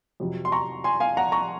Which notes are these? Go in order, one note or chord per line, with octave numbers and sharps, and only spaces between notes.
F2 C3 F#3
C6
A#5 C#6
G#5 C6
F5 G#5
F#5 A#5
A#5 C#6